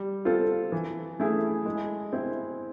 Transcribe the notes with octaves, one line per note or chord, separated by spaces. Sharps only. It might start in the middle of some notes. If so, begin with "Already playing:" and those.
Already playing: G3
C4 F4 A4
E3
A3 C#4 E4 G#4
G#3
C4 E4